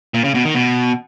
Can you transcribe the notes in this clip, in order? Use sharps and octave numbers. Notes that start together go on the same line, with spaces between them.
A#2
C#3
B2
D#3
B2